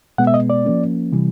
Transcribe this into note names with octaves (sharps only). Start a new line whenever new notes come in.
B2 G#3 B3 F#5
E5
D#5
D5
F3 A#3 C#4
C3 E3 G3